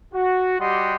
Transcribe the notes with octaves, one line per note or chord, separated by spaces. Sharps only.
F#4
G3 F#4 G4 D#5 F#5 C6